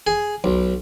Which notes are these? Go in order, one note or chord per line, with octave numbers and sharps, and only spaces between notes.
G#4
B1